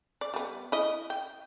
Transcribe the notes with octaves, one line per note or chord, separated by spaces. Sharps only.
D5
G3 B3
E4 D#5
G5